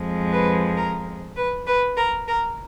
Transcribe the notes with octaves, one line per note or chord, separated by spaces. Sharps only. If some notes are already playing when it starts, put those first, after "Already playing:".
Already playing: F2 F3 G#3
B4
A#4
B4
B4
A#4
A#4